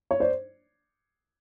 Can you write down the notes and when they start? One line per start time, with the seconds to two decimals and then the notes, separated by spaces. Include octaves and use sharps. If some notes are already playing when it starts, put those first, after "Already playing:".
0.11 C#5
0.20 C5 D5